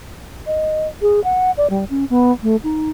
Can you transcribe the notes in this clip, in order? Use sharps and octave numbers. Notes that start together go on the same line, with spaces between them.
D#5
G#4
F#5
D5
G3
C#4
B3
A3
D#4